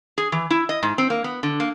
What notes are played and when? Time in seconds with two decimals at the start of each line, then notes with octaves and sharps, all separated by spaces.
0.18 G#4
0.32 E3
0.51 E4
0.69 D#5
0.83 G#2
0.98 C4
1.10 A#3
1.24 B3
1.43 D3
1.60 A#3